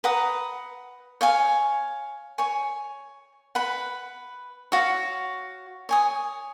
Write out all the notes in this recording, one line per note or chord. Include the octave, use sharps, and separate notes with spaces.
B4 F#5 A#5 D#6
C#5 F5 G#5
C#5 G#5 C#6
B4 F#5 B5
F#4 C#5 F5
C#5 G#5 D#6